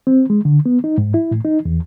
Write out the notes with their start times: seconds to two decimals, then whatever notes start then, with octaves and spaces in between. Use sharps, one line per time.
0.07 C4
0.30 G#3
0.45 D3
0.66 B3
0.84 D#4
0.98 G#2
1.14 E4
1.31 A2
1.45 D#4
1.65 E2